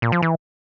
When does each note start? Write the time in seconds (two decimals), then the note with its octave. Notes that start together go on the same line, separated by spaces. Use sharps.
0.02 A#2
0.12 F3
0.22 E3